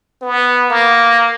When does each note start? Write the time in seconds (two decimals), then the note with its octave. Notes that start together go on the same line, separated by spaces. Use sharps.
0.22 B3
0.70 A#3